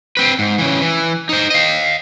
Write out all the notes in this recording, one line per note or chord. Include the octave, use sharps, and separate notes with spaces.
C4 B4
G#2
C#3 E3
E3
D#4 C5
D#5 F5